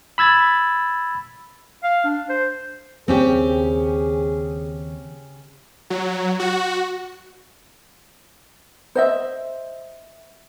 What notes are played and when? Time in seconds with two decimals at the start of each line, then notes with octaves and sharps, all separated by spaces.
0.18 B5 E6 G#6 A6
1.83 F5
2.04 D4
2.29 C5
3.08 D#2 C#3 C4 C#4 G4 G#4
5.90 F#3
6.39 F#4
8.95 C5 D#5 E5